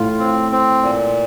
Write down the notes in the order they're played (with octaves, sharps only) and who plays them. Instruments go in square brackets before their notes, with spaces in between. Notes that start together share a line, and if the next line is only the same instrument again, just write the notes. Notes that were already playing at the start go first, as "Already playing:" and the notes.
Already playing: [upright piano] A2 [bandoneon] F4
[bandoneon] C4
C4
A#2